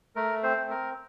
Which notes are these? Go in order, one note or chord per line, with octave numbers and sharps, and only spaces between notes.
A3 A#4
C4 C5
C4
A#4